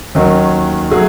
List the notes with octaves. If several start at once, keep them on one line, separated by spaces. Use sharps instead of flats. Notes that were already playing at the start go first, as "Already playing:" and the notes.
D#2 D#3 F#3 C#4
F#3 A3 G#4